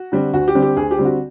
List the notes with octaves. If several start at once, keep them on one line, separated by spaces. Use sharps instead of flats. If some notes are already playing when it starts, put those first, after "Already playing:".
Already playing: F#4
D3 G3 C4
D2 F#4
G4
D3 G3 C4
G4
D2 G#4
G4
D3 G3 C4
F#4